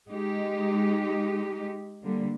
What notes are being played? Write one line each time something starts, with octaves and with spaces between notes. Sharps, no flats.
G#3 D#4 G4
D3 G3 A#3